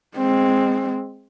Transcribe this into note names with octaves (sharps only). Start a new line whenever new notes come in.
G#3 C4